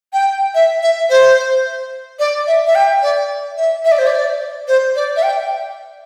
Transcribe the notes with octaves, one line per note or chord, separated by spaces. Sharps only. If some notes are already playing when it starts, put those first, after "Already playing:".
G5
E5
E5
C5
D5
E5
E5
G5
D5
E5
E5
D5
C5
D5
C5
D5
E5
G5